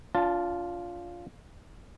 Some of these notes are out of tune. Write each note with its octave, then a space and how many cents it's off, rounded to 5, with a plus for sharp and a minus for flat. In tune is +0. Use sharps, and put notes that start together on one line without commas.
D4 -40 F4 +0 A5 +10